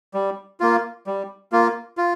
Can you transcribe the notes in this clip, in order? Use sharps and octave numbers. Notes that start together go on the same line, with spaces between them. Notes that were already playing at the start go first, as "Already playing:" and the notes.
G3
A#3 F4
G3
A#3 F4
F4